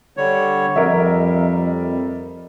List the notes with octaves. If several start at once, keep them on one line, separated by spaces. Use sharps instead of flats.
D3 G3 C#5
F2 G3 A#4 D#5 E5